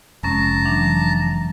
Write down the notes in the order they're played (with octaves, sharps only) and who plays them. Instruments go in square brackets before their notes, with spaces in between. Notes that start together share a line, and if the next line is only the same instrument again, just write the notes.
[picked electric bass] F1 [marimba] G#3 C#4 [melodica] A5 A#5
[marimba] E3 F#3 D4